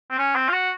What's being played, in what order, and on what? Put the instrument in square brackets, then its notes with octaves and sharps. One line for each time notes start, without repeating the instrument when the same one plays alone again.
[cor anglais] C4
C#4
C4
F4
F#4